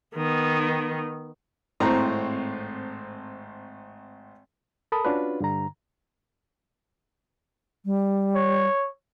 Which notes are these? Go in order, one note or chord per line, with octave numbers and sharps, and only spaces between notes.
D#3 B3
G#1 A2 C4 A#5
A4 A#4 A5 B5 D#6
C#4 D4 F4 F#4 B4
G2 D3 A#5
G3
C#5